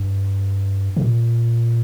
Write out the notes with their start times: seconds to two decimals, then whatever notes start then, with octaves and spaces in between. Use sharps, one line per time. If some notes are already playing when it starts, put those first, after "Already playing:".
Already playing: G2
0.97 C3
1.01 A#2